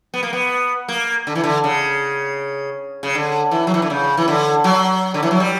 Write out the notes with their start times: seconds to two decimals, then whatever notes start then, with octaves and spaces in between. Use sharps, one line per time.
0.14 B3
0.23 A#3
0.33 B3
0.88 A#3
1.27 D3
1.35 E3
1.44 D3
1.64 C#3
3.03 C#3
3.15 D3
3.51 E3
3.67 F#3
3.74 E3
3.82 D3
3.90 C#3
4.17 E3
4.28 D3
4.64 F#3
5.14 D3
5.23 E3
5.31 F#3
5.40 G3